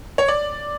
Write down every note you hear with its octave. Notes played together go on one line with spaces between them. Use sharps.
C#5
D5